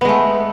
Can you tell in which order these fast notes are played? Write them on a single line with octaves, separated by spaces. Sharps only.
B3 G#3 A3